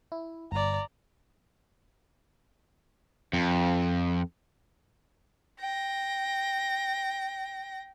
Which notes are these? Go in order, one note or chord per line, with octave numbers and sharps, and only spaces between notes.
E4
G1 D5 A#5
F2
G5 A#6